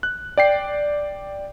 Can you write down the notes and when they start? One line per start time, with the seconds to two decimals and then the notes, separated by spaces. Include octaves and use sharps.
0.03 F#6
0.37 D5 G5 C7